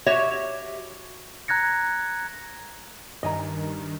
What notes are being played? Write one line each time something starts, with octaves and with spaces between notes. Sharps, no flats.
F#4 G4 C#5 E5
A#5 F#6 G#6 A#6 C#7
G2 D#3 D#5 G#5 A#5